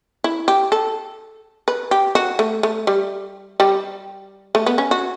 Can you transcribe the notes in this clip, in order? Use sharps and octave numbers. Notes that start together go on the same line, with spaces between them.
E4
G4
A4
B4
G4
F#4
A3
A3
G3
G3
A3
B3
C#4
F#4